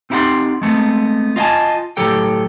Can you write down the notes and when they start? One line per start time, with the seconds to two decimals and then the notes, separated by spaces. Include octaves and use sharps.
0.10 C4 D#4 E4 G4 F#5 C6
0.62 G#3 A3 B3 C4
1.36 F4 D#5 F5 G#5 A5
1.97 A2 F#3 G4 A4 G5